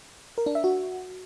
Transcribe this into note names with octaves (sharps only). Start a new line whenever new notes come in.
A#4
D4
E5
F#4